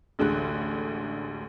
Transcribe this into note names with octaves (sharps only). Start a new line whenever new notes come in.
A1 D2 D3 G#3 F#6